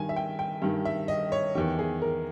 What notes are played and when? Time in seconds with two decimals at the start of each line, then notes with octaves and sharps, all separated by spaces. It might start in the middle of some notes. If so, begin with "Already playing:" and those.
Already playing: G2 D#3 G#5
0.09 E5
0.16 G5
0.39 G5
0.62 G2 D#3
0.85 E5
1.08 D#5
1.32 C#5
1.55 E2 D#3 G4
1.79 G#4
2.02 A#4